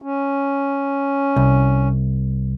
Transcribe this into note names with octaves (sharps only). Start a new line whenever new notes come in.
C#4
C2